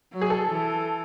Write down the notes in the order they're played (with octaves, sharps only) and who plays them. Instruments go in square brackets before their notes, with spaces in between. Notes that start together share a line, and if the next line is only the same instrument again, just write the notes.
[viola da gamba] F#3
[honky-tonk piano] G#4
A4
[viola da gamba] E3